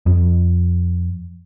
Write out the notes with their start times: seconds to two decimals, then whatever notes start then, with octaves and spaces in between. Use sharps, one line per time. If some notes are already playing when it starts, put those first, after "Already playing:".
0.06 F2